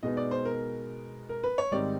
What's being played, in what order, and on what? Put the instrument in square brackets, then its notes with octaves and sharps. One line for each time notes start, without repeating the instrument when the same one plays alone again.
[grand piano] B2 G#3 B3 D#4 [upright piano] D#5
[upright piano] D5
C5
A#4
A#4
B4
C#5
[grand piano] G#2 D#3 G3 C4 D#4 [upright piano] D5